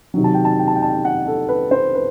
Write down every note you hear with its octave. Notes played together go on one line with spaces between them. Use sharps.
C3 D#3 F#3
A5
G5
A5
G5
A5
G5
A5
G5
F#5
A4
B4
C5
B4